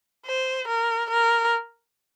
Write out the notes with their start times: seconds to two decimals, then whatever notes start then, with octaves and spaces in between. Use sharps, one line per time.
0.26 C5
0.68 A#4
1.10 A#4